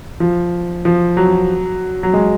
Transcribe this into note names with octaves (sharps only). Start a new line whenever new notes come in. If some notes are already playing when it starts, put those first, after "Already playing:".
F3
F3
F#3
F#3
G#3